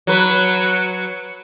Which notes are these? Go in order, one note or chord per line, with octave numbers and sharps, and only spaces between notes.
F#3 B4